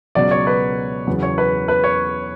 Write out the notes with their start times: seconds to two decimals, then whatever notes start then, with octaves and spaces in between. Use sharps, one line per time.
0.15 C#2 B2 F#3 D5
0.31 C#5
0.47 B4
1.07 E2 C#3 F#3 B3
1.23 C#5
1.38 B4
1.68 B4
1.84 C#5